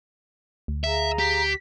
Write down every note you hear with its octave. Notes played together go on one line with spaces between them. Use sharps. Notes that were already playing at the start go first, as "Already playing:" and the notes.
D2
G#4 E5 F5 A#5
G4 B6